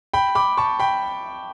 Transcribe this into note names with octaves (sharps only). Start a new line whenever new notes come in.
G5 B5
B5 D6
A5 C#6
G5 B5